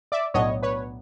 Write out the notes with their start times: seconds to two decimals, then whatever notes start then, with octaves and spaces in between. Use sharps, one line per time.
0.12 D5 E5
0.34 B1 A2 F#3 B3 D4 C#5 D#5
0.63 B4 C#5